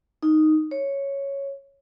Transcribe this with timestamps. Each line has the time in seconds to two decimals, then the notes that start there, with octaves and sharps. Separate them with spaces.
0.23 D#4
0.71 C#5